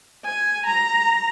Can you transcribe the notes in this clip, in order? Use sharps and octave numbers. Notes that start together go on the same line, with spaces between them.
G#5
A#5